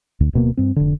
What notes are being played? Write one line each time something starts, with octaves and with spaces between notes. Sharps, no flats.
D2
D1 B2 A#3
G2 C4
F1 D3